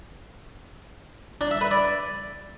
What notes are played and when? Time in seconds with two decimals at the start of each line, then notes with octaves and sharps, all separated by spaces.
1.41 D4
1.51 E5
1.61 B4
1.71 D5